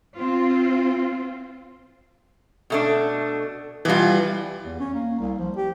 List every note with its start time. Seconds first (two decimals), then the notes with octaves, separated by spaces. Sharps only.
0.18 C4 F4
2.70 B2 A3 D4
3.85 B2 E3 G3 F4
4.65 E2
4.80 C#4
4.94 A#3
5.19 C2
5.39 F3
5.57 G4